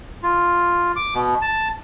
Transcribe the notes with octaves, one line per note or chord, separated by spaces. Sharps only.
F4
D6
B2
A5